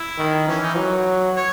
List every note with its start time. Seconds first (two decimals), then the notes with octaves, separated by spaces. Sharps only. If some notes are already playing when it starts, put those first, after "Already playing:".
Already playing: E4
0.18 D#3
0.48 E3 C#4
0.62 D#4
0.77 F#3
1.36 C#5